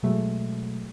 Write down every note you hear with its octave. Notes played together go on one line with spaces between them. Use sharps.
B2 F#3 G#3 A3